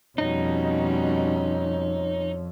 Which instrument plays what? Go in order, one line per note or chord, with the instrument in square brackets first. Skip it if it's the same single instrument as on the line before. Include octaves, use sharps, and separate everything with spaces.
[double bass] F2 [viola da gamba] B2 G3 C#4 [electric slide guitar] D#4 [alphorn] C#5